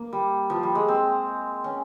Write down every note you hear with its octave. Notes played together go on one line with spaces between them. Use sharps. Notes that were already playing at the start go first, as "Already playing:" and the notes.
Already playing: A#3
G3
F3
G3
G#3
C4
C#4